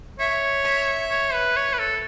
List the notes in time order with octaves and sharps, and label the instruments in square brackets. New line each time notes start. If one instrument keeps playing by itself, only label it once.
[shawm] C#5 [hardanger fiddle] E5
[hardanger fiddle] E5
[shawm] C#5
B4
C#5
B4
A4